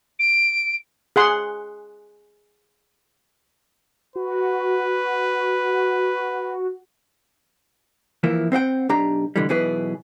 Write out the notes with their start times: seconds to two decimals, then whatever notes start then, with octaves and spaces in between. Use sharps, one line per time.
0.19 D7
1.16 G#4 F#5 C6
4.16 F#4 B4
8.24 E3 F3 A#3 E4
8.52 C4 C5 F#5 G5
8.89 B1 D4 G4 A#5
9.36 B2 D3 E3 G3
9.49 B1 B2 E3 G#4 B4